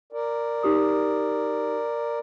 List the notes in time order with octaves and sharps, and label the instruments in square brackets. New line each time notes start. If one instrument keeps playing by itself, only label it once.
[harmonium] A#4 D5
[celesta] D#4 G4 D#6